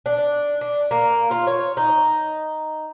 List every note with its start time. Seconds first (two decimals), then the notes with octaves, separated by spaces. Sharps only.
0.06 D4
0.61 D4
0.91 A#3
1.31 F4
1.47 C#5
1.77 D#4